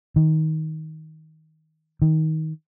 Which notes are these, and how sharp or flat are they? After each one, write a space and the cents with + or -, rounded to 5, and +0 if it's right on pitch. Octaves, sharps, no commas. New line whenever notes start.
D#3 +15
D#3 +20